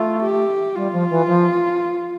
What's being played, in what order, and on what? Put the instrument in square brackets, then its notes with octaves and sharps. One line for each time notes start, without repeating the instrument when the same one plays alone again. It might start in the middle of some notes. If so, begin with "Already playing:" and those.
Already playing: [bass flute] A3 [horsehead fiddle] F4
[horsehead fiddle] G4
[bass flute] G3 [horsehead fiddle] F4
[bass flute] F3
E3
F3